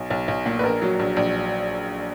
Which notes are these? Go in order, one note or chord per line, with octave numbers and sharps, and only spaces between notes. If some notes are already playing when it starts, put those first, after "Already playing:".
Already playing: B1
B1
B1
A#2
B4
A#1 A#4
F#3
A#1
A#1